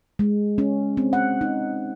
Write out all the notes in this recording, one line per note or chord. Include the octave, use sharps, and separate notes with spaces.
G#3
C#4
C4
F#5
D#4